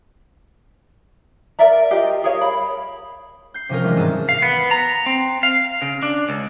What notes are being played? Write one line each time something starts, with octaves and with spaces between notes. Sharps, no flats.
A#4 D5 E5 A#5
F4 G4 D#5 G5
G#4 A#4 C#5 F5
B5
G6 C7
C3 F3 C#4 F4 A#4
D#3 E3 G3 G#3
G#1 G#2 A5 D#6 E6
F5
B3
A#5
C4
F5
C#3
D4
C#2